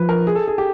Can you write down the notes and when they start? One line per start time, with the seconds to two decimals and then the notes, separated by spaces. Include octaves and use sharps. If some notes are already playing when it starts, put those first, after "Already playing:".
Already playing: F3 B4
0.09 A#4
0.27 G#4
0.35 A4
0.48 G#4
0.58 G4